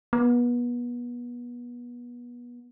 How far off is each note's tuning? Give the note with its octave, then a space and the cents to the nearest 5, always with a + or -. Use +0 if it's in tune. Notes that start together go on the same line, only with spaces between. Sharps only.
B3 -30